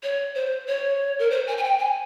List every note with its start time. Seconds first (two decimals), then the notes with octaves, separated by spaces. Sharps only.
0.03 C#5
0.34 C5
0.67 C#5
1.19 A#4
1.30 C5
1.47 G#5
1.58 G#5
1.63 G5
1.79 G#5